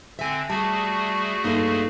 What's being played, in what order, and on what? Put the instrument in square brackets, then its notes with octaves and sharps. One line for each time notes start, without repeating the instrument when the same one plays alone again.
[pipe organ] D3 C4 [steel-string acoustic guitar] E5 G#5
[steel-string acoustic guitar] G3 [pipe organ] A3 F#4 G#4 [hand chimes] A5
[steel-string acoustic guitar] G2 D#4 F5 [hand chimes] A#3 A4